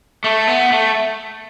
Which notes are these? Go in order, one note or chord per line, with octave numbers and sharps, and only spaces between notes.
A3
B3
A3